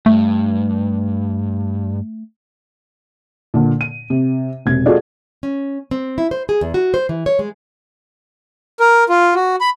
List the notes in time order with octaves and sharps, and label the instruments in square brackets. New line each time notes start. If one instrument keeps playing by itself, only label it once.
[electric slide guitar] G2 [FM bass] A3
[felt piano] A#2 D3
D#7
C3
E1 C3 G#6
F4 F#4 G#4 A4 D5 D#5
[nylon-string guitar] C#4
C4
E4
C5
G#4
E2
F#4
C5
E3
C#5
G#3
[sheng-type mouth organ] A#4
F4
F#4
B5